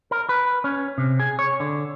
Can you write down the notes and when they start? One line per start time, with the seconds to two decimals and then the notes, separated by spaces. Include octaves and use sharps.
0.11 A#4
0.29 B4
0.64 C#4
0.98 C3
1.20 G#4
1.39 C#5
1.60 D3